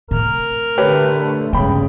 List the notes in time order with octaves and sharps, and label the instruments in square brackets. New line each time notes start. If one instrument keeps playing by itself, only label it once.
[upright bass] A2 C3 [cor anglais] A#4
[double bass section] D3 A3 [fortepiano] G4 B4 C#5
[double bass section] A1 G2 C#3 [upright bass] G#3 B3 [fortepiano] G5 B5